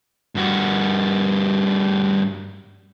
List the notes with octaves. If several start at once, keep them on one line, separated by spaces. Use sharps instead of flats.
G2 F#4